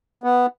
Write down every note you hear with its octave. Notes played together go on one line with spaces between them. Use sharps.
B3